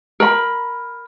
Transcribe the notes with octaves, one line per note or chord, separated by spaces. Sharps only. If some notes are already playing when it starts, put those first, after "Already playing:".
A#4 B5